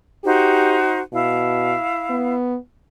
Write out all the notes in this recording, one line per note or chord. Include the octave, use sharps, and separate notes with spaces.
D#4 F#4 G4 C5
B2 E4 F5
B3